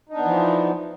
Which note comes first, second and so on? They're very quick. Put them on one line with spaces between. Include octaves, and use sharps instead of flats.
D#4 D4 B3 E3 F3